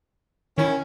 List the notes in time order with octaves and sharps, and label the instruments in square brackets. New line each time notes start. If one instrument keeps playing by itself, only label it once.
[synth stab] D#3 E4 [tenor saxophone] C#4